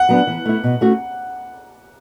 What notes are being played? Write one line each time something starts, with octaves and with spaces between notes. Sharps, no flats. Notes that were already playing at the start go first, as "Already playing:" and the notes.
Already playing: F#5
F#3 B3 D4
E3
A3 E4
B2
A3 C#4 F#4